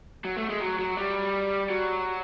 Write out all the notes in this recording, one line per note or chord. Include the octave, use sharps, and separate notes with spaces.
F#3
A3
G#3
F#3
F#3
G3
F#3